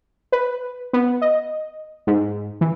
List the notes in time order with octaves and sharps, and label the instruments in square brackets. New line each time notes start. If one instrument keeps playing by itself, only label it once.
[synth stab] B4
B3
D#5
G#2
E3